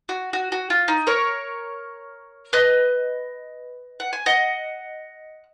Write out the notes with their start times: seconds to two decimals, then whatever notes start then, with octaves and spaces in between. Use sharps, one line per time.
0.09 F#4
0.33 F#4
0.52 F#4
0.70 F4
0.88 D#4
1.07 A#4 C#5
2.53 B4 D#5
4.00 F#5
4.13 G#5
4.26 D#5 F#5